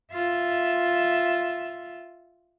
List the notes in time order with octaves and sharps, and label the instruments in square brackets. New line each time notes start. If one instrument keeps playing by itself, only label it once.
[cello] F4 E5